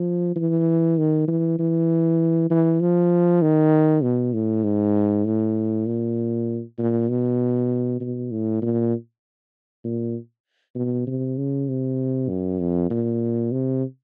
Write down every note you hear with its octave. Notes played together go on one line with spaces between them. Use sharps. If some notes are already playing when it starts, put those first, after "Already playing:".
Already playing: F3
E3
D#3
E3
E3
E3
F3
D#3
B2
A2
G#2
A2
A#2
A#2
B2
B2
A2
A#2
A#2
B2
C3
C#3
C3
F#2
F2
A#2
C3